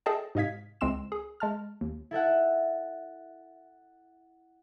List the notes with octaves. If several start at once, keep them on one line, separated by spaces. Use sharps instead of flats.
G#4 A4 D#5 E5 G5 A5
G#2 C3 D#5 F5 G#6 B6
C#2 G#3 C4 C6 E6 E7
G#4
G#3 A5 F6
D#2
E4 A4 E5 F#5